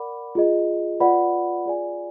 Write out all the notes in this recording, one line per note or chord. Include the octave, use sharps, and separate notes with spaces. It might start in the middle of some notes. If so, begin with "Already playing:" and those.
Already playing: A#4 D5 F#5 B5 D6
F4 G#4 D#5
F4 B4 D5 F#5 B5
F4 G#4 D5 G#5